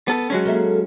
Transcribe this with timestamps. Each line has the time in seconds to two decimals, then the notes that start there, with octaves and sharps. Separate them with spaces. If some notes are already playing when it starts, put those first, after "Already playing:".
0.08 B3 A4
0.30 F#3 G#3 C#4
0.45 A#3 A4 E5